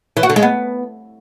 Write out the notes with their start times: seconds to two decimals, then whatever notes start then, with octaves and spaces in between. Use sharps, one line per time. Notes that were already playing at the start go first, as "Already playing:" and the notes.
0.17 E3
0.23 F#4
0.30 D3
0.36 G#3
0.43 B3